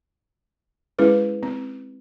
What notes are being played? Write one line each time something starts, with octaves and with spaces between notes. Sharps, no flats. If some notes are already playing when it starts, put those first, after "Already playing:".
G#3 C#4 E4 G#4 B4
C4